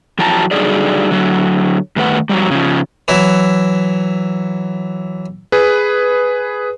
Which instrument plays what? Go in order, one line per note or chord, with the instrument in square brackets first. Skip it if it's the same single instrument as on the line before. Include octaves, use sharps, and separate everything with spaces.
[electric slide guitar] F2 E3 F#3 G5 A5 A#5
D3 F#3 G3 D#4 G#4 D5
D3 F#3
G2 D#3 A3 B4 F#5
F2 F#3 G3
C#3 F3
[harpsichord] E3 F#3 E4
[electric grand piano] G#4 B4